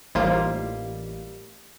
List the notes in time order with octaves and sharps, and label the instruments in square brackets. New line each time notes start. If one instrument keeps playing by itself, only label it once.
[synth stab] A1 [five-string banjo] G3 A#3 [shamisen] D#4 F4 [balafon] C5 A#5